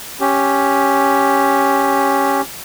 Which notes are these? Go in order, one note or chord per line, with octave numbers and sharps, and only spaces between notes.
C#4 G4